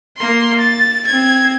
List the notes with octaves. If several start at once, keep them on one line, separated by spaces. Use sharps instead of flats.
A#3 C6
A6
C4 G#6